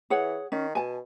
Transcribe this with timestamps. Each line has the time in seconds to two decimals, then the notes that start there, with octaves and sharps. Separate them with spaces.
0.10 E3 G#4 C#5 F#5
0.52 D#3 C#4
0.75 B2 G#5 A5